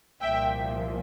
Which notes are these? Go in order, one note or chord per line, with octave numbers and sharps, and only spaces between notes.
C2 A#2 F3 E5 G5